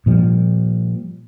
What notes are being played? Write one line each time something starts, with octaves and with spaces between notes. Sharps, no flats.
A#2 F3 G3